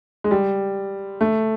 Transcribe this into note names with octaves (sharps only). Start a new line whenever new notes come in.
G#3
G3
A3